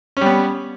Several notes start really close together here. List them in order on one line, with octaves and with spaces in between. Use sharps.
C#4 G3 B3